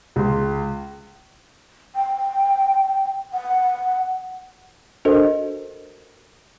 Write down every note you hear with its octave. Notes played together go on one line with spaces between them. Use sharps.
C#2 C6
G5
F#5
D4 F#4 A4 A#4 C5 D#5